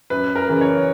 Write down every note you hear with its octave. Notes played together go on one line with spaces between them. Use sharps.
F#2 B4
A#4
C#3 E3
C#5